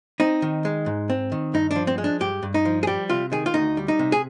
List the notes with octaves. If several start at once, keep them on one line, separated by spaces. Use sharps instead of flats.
C4 D#4
D#3
G#3
G#2
C4
D#3
G2 D#4
D4
F3
C4
G#3
D4
G2 G4
G2
D#4
F3
G#4
G3 G4
C3 F4
D#3 G#4
F4
D2 D#4
G3
D#4
C3
G#4